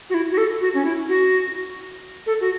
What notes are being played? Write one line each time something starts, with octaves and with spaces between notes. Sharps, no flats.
F#4
E4
F#4
A4
F#4
C#4
E4
F#4
A4
F#4